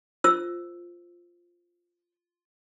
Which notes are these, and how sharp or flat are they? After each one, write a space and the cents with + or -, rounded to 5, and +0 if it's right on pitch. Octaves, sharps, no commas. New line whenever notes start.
F4 +0 C5 +0 E6 +0